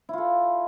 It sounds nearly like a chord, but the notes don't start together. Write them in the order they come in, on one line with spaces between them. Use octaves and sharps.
E4 F4 A4